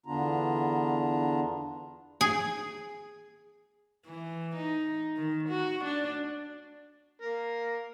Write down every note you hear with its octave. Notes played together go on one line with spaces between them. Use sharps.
E2 D3 B3 D4 F4 A#5
G#4
E3
D#4
D#3
F#4
D4
A#3 A#4